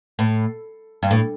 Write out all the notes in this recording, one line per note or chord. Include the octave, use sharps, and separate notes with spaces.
A2
G2
A2